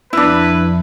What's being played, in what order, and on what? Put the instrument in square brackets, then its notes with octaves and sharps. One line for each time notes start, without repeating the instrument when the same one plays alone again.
[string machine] F2 [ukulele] D4 E4 [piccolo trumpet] B4